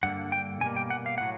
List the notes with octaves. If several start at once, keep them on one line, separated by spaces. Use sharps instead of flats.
G2 D3 G3 A#3 F#5
G5
B2 G3 A#3 G#5
G5
F#5
F5
A2 F#3 F#5